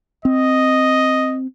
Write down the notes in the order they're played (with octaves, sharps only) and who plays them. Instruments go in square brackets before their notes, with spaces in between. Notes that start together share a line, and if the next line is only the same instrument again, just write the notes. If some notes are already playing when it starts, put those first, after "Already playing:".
[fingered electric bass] C4 [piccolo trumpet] D#5